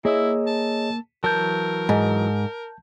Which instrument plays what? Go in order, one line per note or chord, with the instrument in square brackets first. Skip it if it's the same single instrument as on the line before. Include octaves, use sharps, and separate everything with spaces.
[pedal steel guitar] A#3 E6 [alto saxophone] E4 [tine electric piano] G#4 C#5 D#5
[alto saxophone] A5
[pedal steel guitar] E3 F#3 [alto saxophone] A#4 [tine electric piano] A5 G6
[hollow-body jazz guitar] G#2